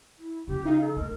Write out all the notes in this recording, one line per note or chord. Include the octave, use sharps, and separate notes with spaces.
E4
C#3 F3 G4
D#4 F5
A4
D2 A#4